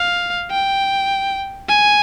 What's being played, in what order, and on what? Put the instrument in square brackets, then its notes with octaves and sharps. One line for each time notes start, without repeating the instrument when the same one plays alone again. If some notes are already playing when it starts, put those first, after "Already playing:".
Already playing: [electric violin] F5
G5
G#5